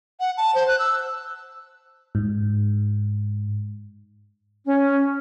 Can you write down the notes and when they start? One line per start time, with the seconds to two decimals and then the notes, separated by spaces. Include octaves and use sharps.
0.20 F#5
0.37 A5
0.55 C5
0.68 F#6
0.79 E6
2.15 G#2
4.66 C#4